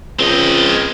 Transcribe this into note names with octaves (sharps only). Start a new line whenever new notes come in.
C#2 C4 D#5